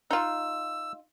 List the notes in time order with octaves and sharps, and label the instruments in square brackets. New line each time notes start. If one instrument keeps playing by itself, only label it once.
[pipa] D#4 F4 [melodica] E6